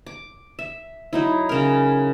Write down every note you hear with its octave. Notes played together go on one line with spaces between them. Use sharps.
D6
E5
F#3 D#4 E4
C#3 A#4